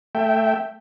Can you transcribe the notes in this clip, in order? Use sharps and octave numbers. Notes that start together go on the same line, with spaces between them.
A3 E5 G5